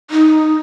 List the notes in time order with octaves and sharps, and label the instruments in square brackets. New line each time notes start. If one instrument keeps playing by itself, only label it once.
[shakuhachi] D#4